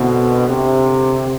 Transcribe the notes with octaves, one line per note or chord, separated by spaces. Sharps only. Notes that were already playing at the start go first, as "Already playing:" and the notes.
Already playing: B2 D3 C4 E4
C3